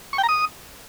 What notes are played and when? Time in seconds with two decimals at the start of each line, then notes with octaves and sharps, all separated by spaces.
0.13 C#6
0.18 G5
0.23 A#5
0.29 D#6